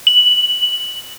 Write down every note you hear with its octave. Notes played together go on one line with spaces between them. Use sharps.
F#7